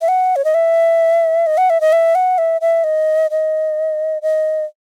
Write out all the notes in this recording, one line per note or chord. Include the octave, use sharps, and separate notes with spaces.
E5
F#5
C#5
D#5
E5
D#5
F#5
E5
D#5
E5
F#5
E5
E5
D#5
D#5
D#5